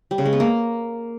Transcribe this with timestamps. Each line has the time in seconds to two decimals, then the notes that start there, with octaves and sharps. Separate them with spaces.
0.11 G3
0.18 C#3
0.25 G#3
0.33 B3
0.40 A#3